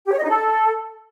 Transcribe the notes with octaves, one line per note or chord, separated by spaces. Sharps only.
G4
C#5
D#5
D#4
A4